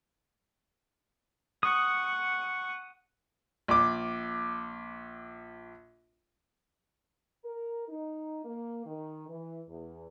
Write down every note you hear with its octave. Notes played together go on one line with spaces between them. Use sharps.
F#5 C#6 D#6
A#1 D6
A#4
D#4
A#3
D#3
E3
E2